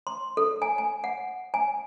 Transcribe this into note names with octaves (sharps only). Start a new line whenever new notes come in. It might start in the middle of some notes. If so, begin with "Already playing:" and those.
C6
A4
G#5
G#5
F#5
G#5